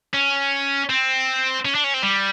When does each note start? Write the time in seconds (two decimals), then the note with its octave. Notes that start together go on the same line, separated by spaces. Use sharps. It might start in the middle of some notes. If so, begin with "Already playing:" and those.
0.14 C#4
0.89 C4
1.65 C#4
1.75 D4
1.84 C#4
1.94 C4
2.03 G3